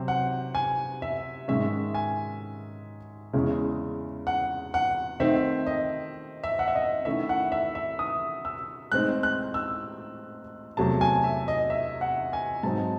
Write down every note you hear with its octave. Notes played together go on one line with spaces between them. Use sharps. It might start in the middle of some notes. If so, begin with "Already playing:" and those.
Already playing: C3 F#3 C4
F#5
G#5
E5
G#2 D#3 G#3 C#4 E5
G#5
E2 C#3 G#3 C#4 E4
F#5
F#5
D#3 A3 C4 D#4 E5
D#5
E5
F#5
E5
D#5
D#3 A3 C#4 E4 E5
F#5
E5
E5
D#6
E6
A2 G#3 C4 D#4 F#6
F#6
E6
E2 C3 F#3 A3 A5
G#5
E5
D#5
E5
F#5
G#5
G#2 F#3 C4 D#4 A5